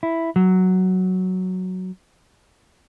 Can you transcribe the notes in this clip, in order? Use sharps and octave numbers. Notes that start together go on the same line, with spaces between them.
E4
F#3